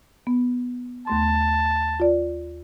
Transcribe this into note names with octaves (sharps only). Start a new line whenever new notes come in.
B3
D#2 A3 A5 C6
F4 D5